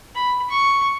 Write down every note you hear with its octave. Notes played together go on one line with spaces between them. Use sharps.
B5
C#6